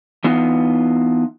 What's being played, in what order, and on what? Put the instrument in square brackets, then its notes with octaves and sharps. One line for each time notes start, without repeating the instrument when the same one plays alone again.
[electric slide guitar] E3 B3 D#4 F4